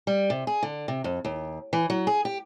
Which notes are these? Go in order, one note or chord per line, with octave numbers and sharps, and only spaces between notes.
G3
C3
G#4
D3
C3
F2
D#2
E3
F#3
G#4
G4